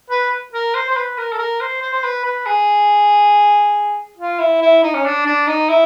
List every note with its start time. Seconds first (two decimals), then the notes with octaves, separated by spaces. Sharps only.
0.10 B4
0.54 A#4
0.75 C5
0.89 C5
0.97 B4
1.18 A#4
1.33 A4
1.39 A#4
1.61 C5
1.82 C5
1.93 C5
2.04 B4
2.25 B4
2.46 G#4
4.18 F4
4.40 E4
4.62 E4
4.83 D#4
4.94 C#4
5.06 D4
5.26 D4
5.47 D#4
5.69 E4